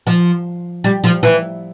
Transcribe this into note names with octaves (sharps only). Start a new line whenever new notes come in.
F3
G3
F3
E3